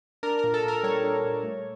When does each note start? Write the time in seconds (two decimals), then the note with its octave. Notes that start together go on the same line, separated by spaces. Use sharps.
0.23 D4 A#4
0.39 A#2 A#4
0.54 A4
0.64 A#2 A#4
0.83 G3 C#5
1.04 D4
1.25 A#2
1.43 A3